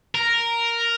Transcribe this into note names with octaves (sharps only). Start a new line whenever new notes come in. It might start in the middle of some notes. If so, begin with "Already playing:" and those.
A#4